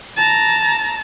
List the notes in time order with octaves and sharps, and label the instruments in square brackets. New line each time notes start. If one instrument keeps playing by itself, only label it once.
[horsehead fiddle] A5 A#5